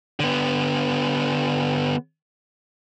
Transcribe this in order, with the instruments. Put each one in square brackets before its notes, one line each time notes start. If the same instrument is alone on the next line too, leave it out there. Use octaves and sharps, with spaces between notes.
[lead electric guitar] D3 B3